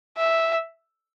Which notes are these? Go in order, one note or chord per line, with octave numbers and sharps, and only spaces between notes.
E5